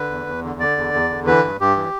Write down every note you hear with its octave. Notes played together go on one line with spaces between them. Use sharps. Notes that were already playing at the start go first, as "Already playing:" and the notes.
Already playing: D3 B4
E2
E2
D3
D3 D5
E2
E2
D3
E3 B4
G2
G2 G4
E3